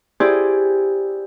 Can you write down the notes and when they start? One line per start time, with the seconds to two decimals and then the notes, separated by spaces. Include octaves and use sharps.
0.20 E4 G4 G#4 C5 D5